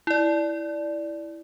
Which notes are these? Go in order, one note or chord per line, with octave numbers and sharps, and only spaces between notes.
E4 D5